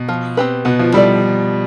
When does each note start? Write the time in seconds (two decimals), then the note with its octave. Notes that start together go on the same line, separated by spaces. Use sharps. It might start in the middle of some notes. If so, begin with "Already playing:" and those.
Already playing: B2
0.09 F3
0.37 C4 G4 B4
0.65 B2 B3
0.79 F3
0.93 G3 E4 A4 D5